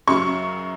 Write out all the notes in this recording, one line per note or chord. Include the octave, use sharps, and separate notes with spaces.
F#2 C#3 F#3 C#6